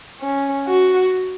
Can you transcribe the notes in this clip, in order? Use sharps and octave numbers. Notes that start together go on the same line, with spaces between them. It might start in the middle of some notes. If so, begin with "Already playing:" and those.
C#4
F#4